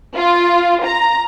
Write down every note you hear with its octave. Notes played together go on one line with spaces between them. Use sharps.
F4
A#5